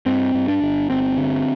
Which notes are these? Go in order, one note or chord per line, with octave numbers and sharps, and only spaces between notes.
G2 C4
G2
D4
G1
G1 C4
D3